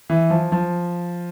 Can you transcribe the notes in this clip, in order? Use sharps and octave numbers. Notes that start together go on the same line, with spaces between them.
E3
F3
F3